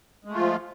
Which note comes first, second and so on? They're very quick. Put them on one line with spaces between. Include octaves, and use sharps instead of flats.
G#3 A3 F4 F3